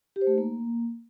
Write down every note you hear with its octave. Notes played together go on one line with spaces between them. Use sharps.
G4
C5
A3
D#4
A#3